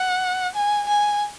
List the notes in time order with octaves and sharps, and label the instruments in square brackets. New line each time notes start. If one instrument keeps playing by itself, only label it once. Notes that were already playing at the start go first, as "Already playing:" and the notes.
Already playing: [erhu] F#5
G#5
G#5